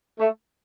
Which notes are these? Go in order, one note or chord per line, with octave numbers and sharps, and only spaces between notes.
A3